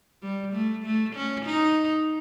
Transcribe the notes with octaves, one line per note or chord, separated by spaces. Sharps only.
G3
A3
A3
C#4
D#4